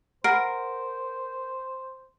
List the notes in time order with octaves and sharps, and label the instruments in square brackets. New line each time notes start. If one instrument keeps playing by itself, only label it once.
[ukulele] A#4 [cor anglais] C5 [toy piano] F#5 A#5 B5 [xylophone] F6 C7 D7